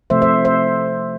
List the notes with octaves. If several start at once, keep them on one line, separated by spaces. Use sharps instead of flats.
C3 F3 A3 C5 E5
C5 E5
C5 E5